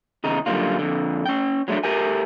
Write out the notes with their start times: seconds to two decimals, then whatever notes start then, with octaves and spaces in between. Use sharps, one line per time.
0.24 E2 C#3 D#4
0.46 F#2 D3 G3 A#3 F4
0.79 F2 D3
1.26 C#4 G5
1.68 F#3 G#3 A3 B3 D4
1.84 A3 G4 A#4 G#5